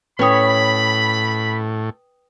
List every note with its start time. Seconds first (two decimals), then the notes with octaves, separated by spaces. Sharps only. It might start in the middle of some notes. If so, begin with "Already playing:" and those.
0.19 A2 C#4 B4 C#5 G5 B5 D#6